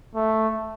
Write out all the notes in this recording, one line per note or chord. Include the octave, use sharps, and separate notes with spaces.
A3